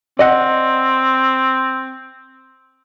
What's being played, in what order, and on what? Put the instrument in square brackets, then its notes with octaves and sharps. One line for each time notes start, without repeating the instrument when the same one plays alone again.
[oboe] C4 [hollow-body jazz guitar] D5 D#5 F#5